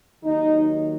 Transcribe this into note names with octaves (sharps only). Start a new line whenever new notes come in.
D#2 D#3 F#3 D#4